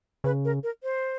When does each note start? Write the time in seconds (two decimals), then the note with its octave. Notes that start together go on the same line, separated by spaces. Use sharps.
0.24 C#3 B4
0.45 A#4
0.63 A#4
0.83 C5